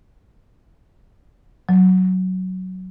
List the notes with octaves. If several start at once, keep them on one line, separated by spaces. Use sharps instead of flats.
F#3